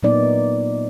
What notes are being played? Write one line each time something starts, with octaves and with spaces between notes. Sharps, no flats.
A#2 F#3 A#3 B3 D#4 D5